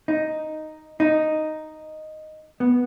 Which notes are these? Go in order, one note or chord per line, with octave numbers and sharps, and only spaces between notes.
D#4
D#4
B3